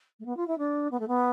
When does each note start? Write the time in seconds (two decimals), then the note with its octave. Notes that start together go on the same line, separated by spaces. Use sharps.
0.19 A3
0.25 B3
0.37 F4
0.47 E4
0.58 D4
0.91 B3
1.00 A3
1.08 B3